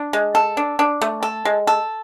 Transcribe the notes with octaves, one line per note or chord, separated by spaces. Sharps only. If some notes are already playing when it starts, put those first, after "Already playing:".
Already playing: D4
G#3
A4
D4
D4
A3
A4
G#3
A4